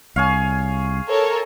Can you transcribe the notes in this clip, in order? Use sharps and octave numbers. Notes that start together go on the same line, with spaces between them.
C2 G#4 C#5 F5
A4 A#4 C#5